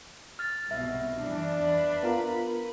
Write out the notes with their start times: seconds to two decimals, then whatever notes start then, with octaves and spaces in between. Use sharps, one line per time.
0.39 F6 A6
0.70 C2 G#2 B2 E5 F6
1.18 F#2 E3 G3 D4
1.60 E2 B4 B5
2.03 B3 F4 A#4